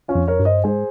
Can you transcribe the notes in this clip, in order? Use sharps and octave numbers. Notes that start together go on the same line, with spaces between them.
C#4 F4
F2
A#4 C#5
G2
C5 D#5
G#2 G#4 C5